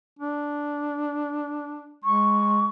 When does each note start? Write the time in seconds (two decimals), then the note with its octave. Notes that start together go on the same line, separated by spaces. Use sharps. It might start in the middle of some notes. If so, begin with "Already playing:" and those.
0.19 D4
2.04 G#3 C#6